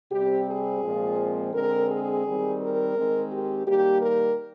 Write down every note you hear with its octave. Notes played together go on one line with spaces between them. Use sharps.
C3 G3 C4 G4
G#4
A#2 F3 G#3 C4
D3 G#3 C4 A#4
G#4
D#3 G3 C4
A#4
D#3 G#3 C4
G4
D#3 G3 A#3 G4
A#4